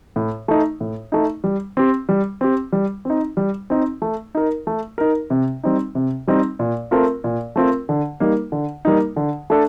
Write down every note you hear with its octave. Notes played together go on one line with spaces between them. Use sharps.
A2
A3 D#4
A2
A3 D#4
G3
C4 G4
G3
C4 G4
G3
C4 D#4
G3
C4 D#4
A3
D#4 A#4
A3
D#4 A#4
C3
G3 C4 D#4
C3
G3 C4 D#4
A#2
A3 C4 F4 A#4
A#2
A3 C4 F4 A#4
D3
G3 A#3 D#4
D3
G3 A#3 D#4
D3
A3 D4 A4